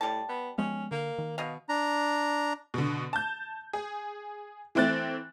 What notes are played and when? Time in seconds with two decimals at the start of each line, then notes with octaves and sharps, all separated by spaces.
0.01 A2 G3 A5
0.29 B3
0.58 F3 G#3 B3 C#4
0.91 D3 A#3
1.18 D#3
1.38 B2 D#5 F5
1.69 D4 A#5
2.74 B2 D3
3.13 A5 G6
3.73 G#4
4.75 E3 A3 C4 F#6 A6